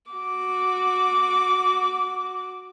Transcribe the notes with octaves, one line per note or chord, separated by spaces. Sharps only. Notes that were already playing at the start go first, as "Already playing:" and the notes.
F#4 D6